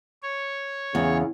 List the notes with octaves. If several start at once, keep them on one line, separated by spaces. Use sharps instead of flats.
C#5
E2 C#3